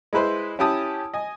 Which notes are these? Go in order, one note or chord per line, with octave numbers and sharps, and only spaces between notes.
G#3 E4 B4 C5
C#4 E4 G4 A5 D#6
D#5 G#5